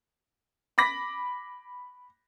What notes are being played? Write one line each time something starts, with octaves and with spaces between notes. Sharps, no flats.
B5 D6 A#6 B6